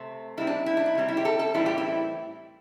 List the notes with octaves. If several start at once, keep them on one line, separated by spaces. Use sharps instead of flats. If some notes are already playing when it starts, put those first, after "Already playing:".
Already playing: C3 A3 C4
C3 G3 C4 E4
D4
E4
D4
E4
C3 G3 C4
E4
G4
A4
A4
A2 E3 G3 C4 E4
G4
E4